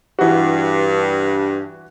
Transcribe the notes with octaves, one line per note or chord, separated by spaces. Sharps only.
G2 E3 F#4